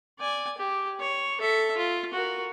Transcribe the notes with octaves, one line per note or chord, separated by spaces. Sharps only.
D5 G#5
G4
C#5
A4 E5
F4
F#4 A#4